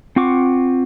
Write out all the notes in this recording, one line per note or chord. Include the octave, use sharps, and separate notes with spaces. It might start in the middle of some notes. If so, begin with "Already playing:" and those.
C4 F4 F#5 C#6 D6